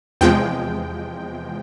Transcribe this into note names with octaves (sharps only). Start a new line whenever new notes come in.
E2 C3 F3 G#3 G5